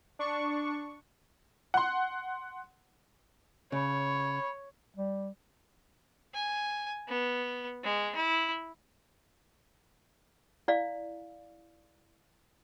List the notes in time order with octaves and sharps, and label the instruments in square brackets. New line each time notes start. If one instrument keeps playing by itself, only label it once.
[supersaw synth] D4 C#6
[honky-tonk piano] F#5 C6
[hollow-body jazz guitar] C#3 [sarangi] C#5 [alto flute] B5
[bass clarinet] G3
[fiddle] G#5
B3
G#3
E4
[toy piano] E4 D5 F5